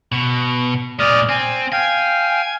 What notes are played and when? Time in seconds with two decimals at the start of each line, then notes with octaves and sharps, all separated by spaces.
0.12 B2 C#6
0.99 A#2 G#3 D5 D#6 F6
1.29 C4 G#5
1.72 F5 G5 G#5